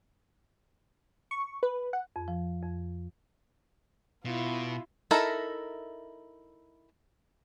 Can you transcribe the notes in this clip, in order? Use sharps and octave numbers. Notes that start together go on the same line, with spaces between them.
C#6
B4
F#5
F2
F3
F2
B2 E4 F4
D#4 E4 A4 A#4 E5